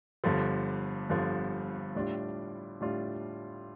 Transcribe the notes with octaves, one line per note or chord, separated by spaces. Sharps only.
G1 G2 D3 F3
G1 G2 D3 F3
A2 G3 D4 F4
A2 G3 D4 F4